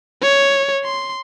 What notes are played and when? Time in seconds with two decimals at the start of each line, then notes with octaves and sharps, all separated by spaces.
0.23 C#5
0.84 C6